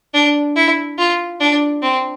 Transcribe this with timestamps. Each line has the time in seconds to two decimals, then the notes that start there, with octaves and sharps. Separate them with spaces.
0.14 D4
0.56 E4
0.98 F4
1.40 D4
1.82 C4